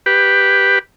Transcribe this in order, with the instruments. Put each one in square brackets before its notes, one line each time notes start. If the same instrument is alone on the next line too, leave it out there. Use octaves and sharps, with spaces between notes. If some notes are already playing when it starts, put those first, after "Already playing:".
[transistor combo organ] G4 B4